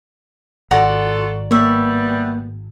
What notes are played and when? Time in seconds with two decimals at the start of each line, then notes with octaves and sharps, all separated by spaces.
0.71 G#1 F4 F#4 A4 D5 F#5 A#5
1.51 G3 A#3 B3 C#5 E5